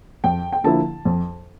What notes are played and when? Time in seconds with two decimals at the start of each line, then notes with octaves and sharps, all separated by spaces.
0.24 F2 G5
0.52 G5
0.64 D3 F3 A#3 E4 A5
1.05 F2